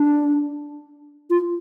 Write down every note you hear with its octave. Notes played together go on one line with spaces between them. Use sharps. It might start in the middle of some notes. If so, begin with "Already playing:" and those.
Already playing: D4
F4